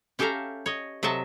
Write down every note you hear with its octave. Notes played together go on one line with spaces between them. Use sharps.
C#4 G4 A4 E5 F5 A#5
C#5 D#5
C3 F#3 D#5 E5 A5